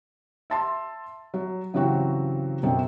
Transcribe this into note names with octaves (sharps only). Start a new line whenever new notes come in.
E5 A5 C6
F#3
G2 C#3 E3 F#3 C4 F#4
F#2 B2 D3 F#3 C4